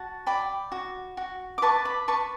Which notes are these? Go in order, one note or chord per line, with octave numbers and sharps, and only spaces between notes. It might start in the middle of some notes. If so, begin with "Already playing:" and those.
Already playing: F#4 F#5 A5
D5 G5 B5
F#4
F#4
D6
B4 A5 C#6
B5 D6
B4 A5 C#6